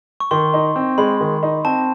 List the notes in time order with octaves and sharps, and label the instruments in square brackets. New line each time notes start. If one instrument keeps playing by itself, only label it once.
[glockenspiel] C#6
[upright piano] D#3 [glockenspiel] C6
[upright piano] D#4
C4
[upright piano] G#3 [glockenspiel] B5
[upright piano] D#3
D#4
[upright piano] C4 [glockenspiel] A5